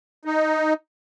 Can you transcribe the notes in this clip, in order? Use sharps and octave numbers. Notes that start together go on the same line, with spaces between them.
D#4